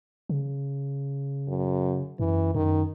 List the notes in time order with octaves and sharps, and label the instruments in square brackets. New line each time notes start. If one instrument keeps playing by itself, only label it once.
[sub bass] C#3
[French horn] F#2
[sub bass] F#2 [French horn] E3
[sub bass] F#2 [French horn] D#3